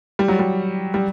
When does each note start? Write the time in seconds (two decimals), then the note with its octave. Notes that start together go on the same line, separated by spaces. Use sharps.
0.19 G3
0.28 F#3
0.39 G3
0.94 G3